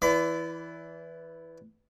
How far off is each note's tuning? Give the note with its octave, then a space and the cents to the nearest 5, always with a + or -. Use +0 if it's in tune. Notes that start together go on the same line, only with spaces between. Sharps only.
E3 +0 D5 -20 B5 +30